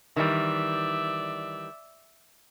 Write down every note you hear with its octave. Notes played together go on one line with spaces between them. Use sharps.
D#3 E3 G3 D5 E5